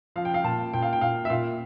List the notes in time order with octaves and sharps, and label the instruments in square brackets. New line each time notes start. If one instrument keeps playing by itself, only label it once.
[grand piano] F3 [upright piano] F5
[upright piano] G5
F5
[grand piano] A#2 [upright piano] A5
[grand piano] A#2 [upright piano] G5
[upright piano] F5
G5
[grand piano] A#2 [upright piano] F5
[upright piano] E5
[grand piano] A#2 [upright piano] F5